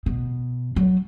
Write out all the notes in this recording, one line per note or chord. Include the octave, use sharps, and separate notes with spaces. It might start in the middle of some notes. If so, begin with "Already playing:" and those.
B2
F#3